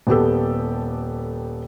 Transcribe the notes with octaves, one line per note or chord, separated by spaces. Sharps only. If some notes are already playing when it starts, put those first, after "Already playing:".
D#1 B3 G4 A4